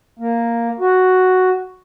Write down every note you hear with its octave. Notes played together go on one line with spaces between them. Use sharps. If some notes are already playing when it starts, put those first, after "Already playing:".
A#3
F#4